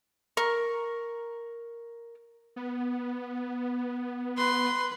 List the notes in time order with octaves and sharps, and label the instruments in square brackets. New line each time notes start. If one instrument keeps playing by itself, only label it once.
[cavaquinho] A#4 C#6
[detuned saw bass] B3
[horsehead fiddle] B4 [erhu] C6